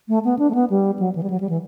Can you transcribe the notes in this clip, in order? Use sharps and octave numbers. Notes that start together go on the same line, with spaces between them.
A3
B3
D4
A3
B3
G3
F#3
E3
G3
F#3
G3
E3